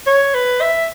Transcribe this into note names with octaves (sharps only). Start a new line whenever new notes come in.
C#5
B4
E5